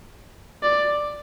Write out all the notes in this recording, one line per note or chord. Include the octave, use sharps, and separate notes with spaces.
D5